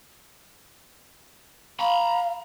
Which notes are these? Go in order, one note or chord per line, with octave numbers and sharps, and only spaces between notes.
F5 A#5 B5